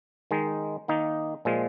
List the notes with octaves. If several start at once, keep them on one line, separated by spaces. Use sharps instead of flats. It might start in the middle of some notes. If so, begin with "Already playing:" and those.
D#3 G#3 D#4
D#3 A#3 D#4
A#2 F3 G#3